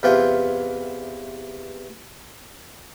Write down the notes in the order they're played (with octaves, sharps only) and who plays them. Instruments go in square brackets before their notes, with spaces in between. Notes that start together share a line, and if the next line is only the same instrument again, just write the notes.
[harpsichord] E2 C3 E3 F4 G5